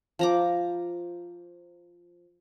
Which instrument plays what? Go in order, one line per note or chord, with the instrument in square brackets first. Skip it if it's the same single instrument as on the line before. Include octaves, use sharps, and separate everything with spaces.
[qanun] F3 A#5 D6